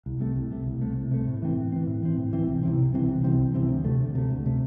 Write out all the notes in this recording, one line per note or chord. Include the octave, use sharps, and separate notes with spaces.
C2
C3 A3
C2
C3 A3
C2
C3 A3
C2
C3 A3
A2
E3 C4
A2
E3 C4
A2
E3 C4
A2
E3 C4
C2
C3 E3 C4
C2
C3 E3 C4
C2
C3 E3 C4
C2
C3 E3 C4
D2
C3 A3
D2
C3 A3
D2
C3 A3